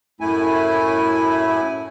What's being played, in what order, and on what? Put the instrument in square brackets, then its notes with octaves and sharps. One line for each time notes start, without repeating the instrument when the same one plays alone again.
[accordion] F#2 A2 A3 E4 G#5